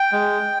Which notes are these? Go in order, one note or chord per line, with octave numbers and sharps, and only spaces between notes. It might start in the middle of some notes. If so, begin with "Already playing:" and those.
Already playing: G5
G#3